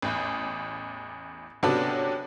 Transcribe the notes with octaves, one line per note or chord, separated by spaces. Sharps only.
A1 E2
C3 F#3 B3 C#4 D4 A4